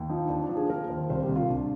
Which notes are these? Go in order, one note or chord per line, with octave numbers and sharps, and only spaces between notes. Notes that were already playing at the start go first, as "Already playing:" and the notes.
Already playing: D#2
F3 D#4
D#2 D4
D4
F3
G#4
F3 A#4
D#2 C5
C2 C5
G4
C2
F4
C2 D4